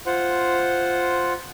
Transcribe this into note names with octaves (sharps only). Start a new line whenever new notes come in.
F4 C5 F#5